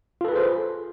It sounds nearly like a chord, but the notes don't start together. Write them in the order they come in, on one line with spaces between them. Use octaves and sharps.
F4 A4 B4 G#4 C5